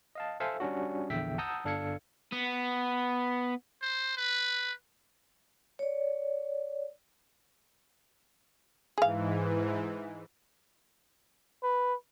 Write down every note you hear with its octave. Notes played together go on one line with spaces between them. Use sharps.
D#5 F5 A5
A4 C5 E5 F5 G#5 E6
G3 C#4 D4 F#4
A#1 E2 D3 E5 G5 B6
F#5 A5 A#5 D#6 E6 G6
G1 D4 A4 F5 G#6 C#7
B3
C5
B4
C#5 D5
G#2 E3 G#4 F5
B4